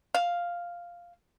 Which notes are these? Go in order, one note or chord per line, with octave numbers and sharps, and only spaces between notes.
F5